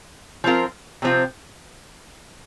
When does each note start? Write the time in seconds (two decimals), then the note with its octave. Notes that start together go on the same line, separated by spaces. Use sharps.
0.44 F3 C4 F4 A#4
1.02 C3 F3 C4 F4